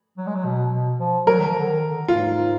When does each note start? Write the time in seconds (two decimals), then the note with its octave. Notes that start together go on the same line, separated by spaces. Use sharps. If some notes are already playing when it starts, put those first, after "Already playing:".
0.18 F#3
0.27 G#3
0.35 F#3
0.45 B2
0.72 B2
0.99 F3
1.27 F#3 A#4
1.39 D#3
1.48 F3
1.58 D3
1.67 D#3
1.88 D3
2.08 G#2 F4